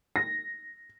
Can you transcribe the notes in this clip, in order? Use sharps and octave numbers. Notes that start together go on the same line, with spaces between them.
A#6